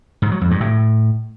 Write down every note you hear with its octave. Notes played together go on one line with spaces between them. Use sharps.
G#2
F#3
F2
G2
A2